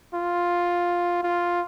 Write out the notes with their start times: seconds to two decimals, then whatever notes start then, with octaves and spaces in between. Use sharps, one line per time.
0.14 F4
1.23 F4